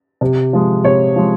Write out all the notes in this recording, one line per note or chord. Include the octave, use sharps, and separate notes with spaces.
C3
F3 G#3
C3 C#5
F3 G#3